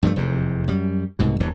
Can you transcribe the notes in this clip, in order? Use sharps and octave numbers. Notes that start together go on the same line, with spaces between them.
G2 F3 G3 A3
F1 E2 C3
F#2 G3
C2 G#2 B2
D#1 E2 G2 E3